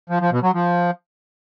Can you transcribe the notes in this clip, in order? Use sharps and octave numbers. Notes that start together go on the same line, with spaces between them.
F3
F3
B2
F#3
F3